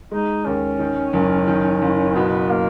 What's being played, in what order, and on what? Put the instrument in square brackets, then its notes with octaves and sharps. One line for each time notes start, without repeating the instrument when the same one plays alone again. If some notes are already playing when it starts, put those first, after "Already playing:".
[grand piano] G#3 [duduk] D#4
[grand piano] D#2 [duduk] C#4
[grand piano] D#3
F#1
D#3
F#1
[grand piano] B2 [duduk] B3
[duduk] A#3